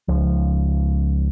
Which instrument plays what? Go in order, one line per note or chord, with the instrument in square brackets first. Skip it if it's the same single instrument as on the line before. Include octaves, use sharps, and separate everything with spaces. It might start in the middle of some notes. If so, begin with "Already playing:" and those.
[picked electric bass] C#2 F3